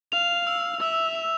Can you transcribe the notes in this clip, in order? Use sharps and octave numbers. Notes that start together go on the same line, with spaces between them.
F5 F7
E6
E5 E6
F7